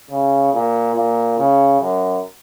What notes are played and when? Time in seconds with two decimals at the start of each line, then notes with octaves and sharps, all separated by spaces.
0.11 C#3
0.54 A#2
0.96 A#2
1.39 C#3
1.81 F#2